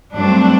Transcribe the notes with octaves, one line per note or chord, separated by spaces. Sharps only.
G2 F#3 A3 C4 D4